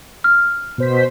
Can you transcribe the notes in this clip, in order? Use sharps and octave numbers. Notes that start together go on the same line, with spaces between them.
F6
B2 C5 B6